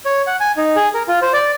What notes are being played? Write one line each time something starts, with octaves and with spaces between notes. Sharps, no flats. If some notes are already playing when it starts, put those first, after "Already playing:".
C#5
F#5
G#5
D#4
G#4
A#4
F4
C5
D5